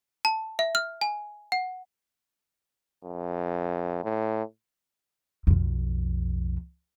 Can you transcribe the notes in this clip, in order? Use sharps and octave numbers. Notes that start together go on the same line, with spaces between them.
A5
E5
F6
G#5
F#5
F2
A2
B1 F2